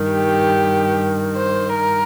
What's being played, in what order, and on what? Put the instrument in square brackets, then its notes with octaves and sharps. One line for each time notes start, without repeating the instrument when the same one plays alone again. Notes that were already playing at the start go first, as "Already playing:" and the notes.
Already playing: [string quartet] G2 D#3
G4
C5
A#4